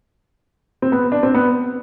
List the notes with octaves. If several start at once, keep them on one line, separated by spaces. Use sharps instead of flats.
C4
B3
D4
C4
B3